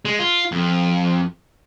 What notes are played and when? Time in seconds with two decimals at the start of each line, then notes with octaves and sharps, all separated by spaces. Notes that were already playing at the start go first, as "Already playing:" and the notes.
0.05 G#3
0.19 F4
0.52 F2